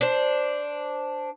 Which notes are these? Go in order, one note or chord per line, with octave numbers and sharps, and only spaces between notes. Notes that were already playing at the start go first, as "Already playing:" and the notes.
D4 C5